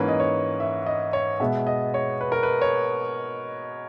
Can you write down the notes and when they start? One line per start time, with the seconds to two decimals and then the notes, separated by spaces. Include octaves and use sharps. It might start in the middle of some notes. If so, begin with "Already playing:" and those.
Already playing: G#2 E3 A#3 C#4 B4
0.08 D#5
0.20 C#5
0.60 E5
0.86 D#5
1.13 C#5
1.40 B2 G#3 B3 E5
1.67 D#5
1.94 C#5
2.21 B4
2.32 A#4
2.43 B4
2.61 C#5